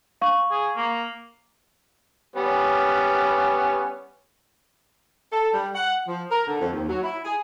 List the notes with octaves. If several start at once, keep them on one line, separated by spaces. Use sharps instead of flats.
F5 C#6
G#4
A#3
G3 B3 C#4
A4
G3
F#5
F3
A#4
D3
F2
D#2
F#3
E4
G#4